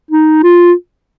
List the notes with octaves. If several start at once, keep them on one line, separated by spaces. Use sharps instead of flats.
D#4
F4